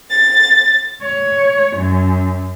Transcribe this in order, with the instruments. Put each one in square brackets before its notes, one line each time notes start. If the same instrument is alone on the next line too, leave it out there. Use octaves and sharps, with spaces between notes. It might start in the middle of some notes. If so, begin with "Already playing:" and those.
[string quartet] A6
C#5
F#2